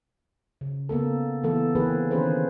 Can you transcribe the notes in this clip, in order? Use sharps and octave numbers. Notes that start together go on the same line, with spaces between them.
C#3
C#3 A#3 B3 A4
E3 A3 B3 A4
D3 E3 A#3 C4 G#4 B4
D#3 E3 C#4 G#4 B4 C5